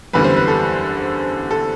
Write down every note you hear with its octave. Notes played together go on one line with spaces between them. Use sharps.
F#1 E2 D3 G3 B4
C5
B4
A4
A4